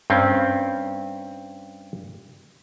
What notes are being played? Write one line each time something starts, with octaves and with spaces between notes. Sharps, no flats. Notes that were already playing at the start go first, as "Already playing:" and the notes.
G2 C4 C#4